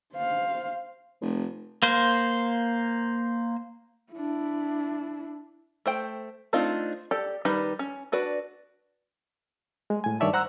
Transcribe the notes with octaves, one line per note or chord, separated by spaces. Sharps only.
C5 F5
F1
A#3 C5
D4 E4
A3 C5 G5
A3 C4 D4 D#4 F4
G4 A4 D5
D#3 G3 D#4 B4 B5
C#4
D4 F#4 B4 D5
G#3
A2 G#5
G2 D#3 C#5 D5 E5 A5
C5 F#5 A#5 E6 F#6